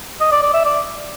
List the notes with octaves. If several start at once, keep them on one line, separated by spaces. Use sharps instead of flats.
D#5
D5
D5
E5
D5